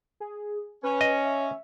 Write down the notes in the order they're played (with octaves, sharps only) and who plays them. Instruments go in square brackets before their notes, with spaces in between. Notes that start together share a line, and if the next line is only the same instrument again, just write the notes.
[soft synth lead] G#4
[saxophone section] C#4 [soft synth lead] B4
[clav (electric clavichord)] D#5
[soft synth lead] E5